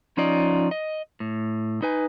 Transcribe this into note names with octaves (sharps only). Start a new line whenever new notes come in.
F3 C#4 D#4 F4 D5 D#5
D#5
A2
D#4 B4 G#5